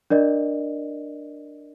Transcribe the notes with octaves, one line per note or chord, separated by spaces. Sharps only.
D4 A#4 D5 D#5